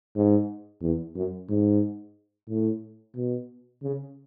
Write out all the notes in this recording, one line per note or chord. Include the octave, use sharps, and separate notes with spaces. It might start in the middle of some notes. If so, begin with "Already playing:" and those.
G#2
E2
F#2
G#2
A2
B2
C#3